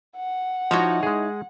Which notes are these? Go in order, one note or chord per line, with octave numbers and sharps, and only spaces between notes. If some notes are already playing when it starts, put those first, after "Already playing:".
F#5
F3 D#4 E4 F#4 C#5
G#3 G#4